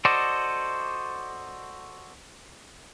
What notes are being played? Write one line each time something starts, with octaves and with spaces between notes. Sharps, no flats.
F#4 A4 C5 D5 D#5